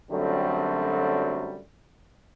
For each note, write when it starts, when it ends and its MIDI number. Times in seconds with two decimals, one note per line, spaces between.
0.10 1.60 42
0.10 1.60 50
0.10 1.60 54
0.10 1.60 55
0.10 1.60 57
0.10 1.60 60